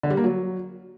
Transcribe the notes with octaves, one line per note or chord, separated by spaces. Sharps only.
D3
G3
A#3
F#3